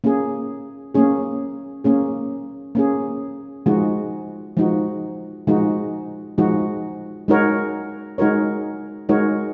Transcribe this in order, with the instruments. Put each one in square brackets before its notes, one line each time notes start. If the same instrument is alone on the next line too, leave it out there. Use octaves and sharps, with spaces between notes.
[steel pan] A#3 C#4 G#4
A#3 C#4 G#4
A#3 C#4 G#4
A#3 C#4 G#4
F3 G#3 D#4 F#4
F3 G#3 D#4 F#4
F3 G#3 D#4 F#4
F3 G#3 D#4 F#4
G#3 D#4 F#4 A#4 C#5
G#3 D#4 F#4 A#4 C#5
G#3 D#4 F#4 A#4 C#5